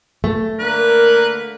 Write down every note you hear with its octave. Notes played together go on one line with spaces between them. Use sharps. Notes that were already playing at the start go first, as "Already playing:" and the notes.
A3
D3 A#3 A#4 B4